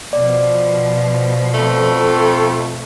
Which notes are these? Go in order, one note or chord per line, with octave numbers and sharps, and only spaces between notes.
B2 F3 D5
F2 A3